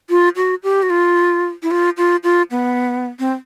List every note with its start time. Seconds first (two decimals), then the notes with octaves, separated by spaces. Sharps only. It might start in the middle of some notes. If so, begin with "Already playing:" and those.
0.10 F4
0.36 F#4
0.64 G4
0.83 F#4
0.90 F4
1.63 E4
1.71 F4
1.97 F4
2.24 F4
2.51 B3
3.19 C4